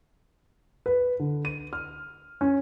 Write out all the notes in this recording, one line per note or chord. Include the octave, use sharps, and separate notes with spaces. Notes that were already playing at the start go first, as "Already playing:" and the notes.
B4
D3
D#7
F6
C#4